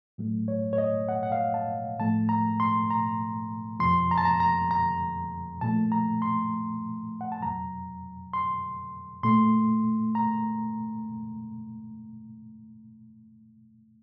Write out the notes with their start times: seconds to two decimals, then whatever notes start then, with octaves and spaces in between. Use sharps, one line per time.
0.18 A2 F#3 A3
0.48 C#5
0.73 C#5
0.78 D#5
1.09 F#5
1.23 F#5
1.32 F5
1.54 A5
1.99 A2 F3 A3 A5
2.29 A#5
2.60 C6
2.90 A#5
3.80 F2 C3 F3 C6
4.11 A#5
4.18 A5
4.25 A#5
4.40 A#5
4.71 A#5
5.61 A#2 F3 A3 A5
5.92 A#5
6.22 C6
7.21 F#5
7.32 A5
7.42 F2 C3 F#3 A#5
8.33 C6
9.23 A#2 A3 C6
10.15 A#5